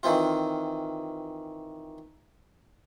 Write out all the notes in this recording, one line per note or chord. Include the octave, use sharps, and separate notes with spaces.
D#3 E3 C4 F4